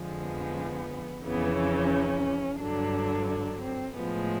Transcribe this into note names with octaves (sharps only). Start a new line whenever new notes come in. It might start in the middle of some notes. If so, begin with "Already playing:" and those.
Already playing: F2 D3 F3 G#3
B3
F2 C#3 E3 B3
C#4
G2 D3 F#3 D4
D4
C4
A2 F3 G#3 B3